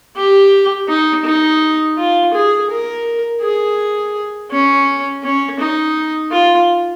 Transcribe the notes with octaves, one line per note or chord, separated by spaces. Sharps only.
G4
D#4
D#4
F4
G#4
A#4
G#4
C#4
C#4
D#4
F4